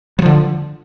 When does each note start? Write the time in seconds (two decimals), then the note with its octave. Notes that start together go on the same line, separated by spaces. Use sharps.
0.19 F#3
0.22 F3
0.26 D3